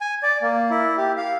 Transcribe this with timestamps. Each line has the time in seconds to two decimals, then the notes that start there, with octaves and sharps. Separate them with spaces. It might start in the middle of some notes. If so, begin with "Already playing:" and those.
0.01 G#5
0.23 D5
0.42 A#3
0.70 E4
0.97 G4
1.17 F5